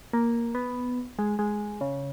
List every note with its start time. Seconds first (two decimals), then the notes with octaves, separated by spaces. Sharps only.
0.13 A#3
0.55 B3
1.19 G#3
1.39 G#3
1.81 C#3